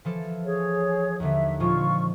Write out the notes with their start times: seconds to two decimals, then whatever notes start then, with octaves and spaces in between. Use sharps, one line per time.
0.05 E3 F3 A4
0.44 G#4 C#5
1.20 D#2 D3 E5
1.60 A#2 F3 G#3 F4 C#6